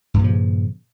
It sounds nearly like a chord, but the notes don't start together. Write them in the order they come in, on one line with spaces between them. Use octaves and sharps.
G2 A#2 F3 C#3